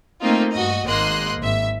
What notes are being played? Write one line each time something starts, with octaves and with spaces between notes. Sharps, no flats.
A3 A#3 C4 D#4 F4
G2 F#4 D#5
G#1 A#3 D#5 C6 F#6
G#1 E5